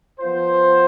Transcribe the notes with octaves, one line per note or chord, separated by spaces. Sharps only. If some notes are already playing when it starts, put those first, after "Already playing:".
F3 B3 F4 C5